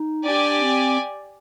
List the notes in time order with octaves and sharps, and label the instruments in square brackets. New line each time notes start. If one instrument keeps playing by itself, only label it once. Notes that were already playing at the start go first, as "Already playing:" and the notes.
Already playing: [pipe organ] D#4
[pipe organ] D4 [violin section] G4 D5 G#5
[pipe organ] C4